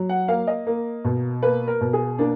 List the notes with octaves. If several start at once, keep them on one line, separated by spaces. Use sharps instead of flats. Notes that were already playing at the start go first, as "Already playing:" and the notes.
Already playing: F#3
F#5
A#3 F5
D#5
A#3
B2
A#3 B4
A#4
B2
G#4
A#3 D4